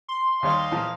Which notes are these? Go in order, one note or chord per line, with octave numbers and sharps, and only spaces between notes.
C6
D#2 G3 C#5 D#5 F5
A#2 E3 F3